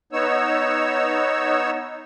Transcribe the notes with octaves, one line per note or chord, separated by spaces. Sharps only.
B3 D#4 C#5 E6